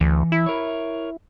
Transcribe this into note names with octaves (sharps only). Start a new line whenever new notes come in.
D2 E3
E4
A#4 C#5